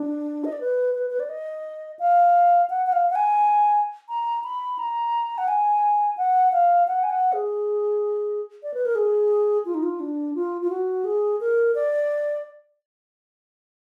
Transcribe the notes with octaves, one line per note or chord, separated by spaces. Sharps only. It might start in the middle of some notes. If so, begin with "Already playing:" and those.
Already playing: D4
D#5
D5
B4
B4
B4
D5
D#5
F5
F#5
F#5
F5
F#5
G#5
A#5
B5
A#5
F#5
G#5
F#5
F5
F#5
G#5
F#5
G#4
D5
B4
A#4
G#4
F4
D#4
F4
D4
F4
F4
F#4
G#4
A#4
D5